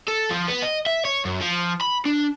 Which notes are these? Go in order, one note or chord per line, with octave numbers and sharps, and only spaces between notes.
A4
F3
B3
D#5
E5
C#5
F#2
F3
B5
D4